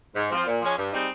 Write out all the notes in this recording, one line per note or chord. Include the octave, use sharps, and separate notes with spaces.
G#2
F3 C4 F4 C5
A#2
F3 G#3 C#4
G2
G3 C4 D#4 G#4